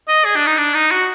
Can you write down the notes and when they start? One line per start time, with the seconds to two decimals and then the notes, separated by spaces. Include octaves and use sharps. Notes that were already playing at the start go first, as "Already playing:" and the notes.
0.08 D#5
0.25 G#4
0.35 D4
0.46 D#4
0.57 D4
0.74 D#4
0.91 F#4